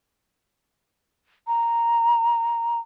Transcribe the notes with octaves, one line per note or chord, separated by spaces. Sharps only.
A#5